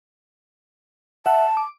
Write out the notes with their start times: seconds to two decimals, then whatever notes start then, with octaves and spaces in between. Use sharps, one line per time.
1.26 E5 F#5 A5
1.57 D6